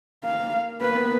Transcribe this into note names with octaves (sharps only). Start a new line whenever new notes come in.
A#3 F5
A#3 B4
B3